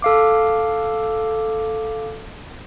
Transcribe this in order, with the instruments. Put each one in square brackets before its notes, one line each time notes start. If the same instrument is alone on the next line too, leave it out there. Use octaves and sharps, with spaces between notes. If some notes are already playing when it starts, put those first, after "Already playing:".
[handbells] A4 F5 D6